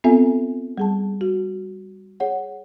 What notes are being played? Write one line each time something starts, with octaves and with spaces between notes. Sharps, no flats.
B3 C4 F4 A4 E5 G#5
G3 G#4 A5
F#4
G#4 C#5 F#5